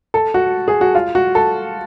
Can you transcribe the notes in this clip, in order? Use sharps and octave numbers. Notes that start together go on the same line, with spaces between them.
A4
F#4
G#4
F#4
F4
F#4
A4